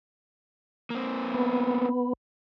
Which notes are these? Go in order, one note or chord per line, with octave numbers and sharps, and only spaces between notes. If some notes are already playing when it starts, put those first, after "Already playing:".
A#3 C4
B3